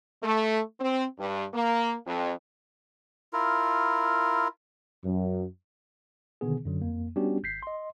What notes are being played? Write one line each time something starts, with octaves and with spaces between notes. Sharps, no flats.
A3
C4
G2
A#3
F2
E4 F4 A#4
F#2
B2 D3 D#3 B3 G#4
F#2 D3 F#3
F2 A#3
G3 B3 C#4 D4 F#4 G4
G#1 G6 B6 C7
D#5 C6